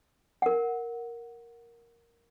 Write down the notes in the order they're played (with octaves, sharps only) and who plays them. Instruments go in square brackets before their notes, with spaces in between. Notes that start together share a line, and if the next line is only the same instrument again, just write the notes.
[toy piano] A#4 F#5